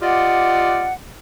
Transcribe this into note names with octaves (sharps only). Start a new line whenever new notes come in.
F4 G4 D5 D#5 F#5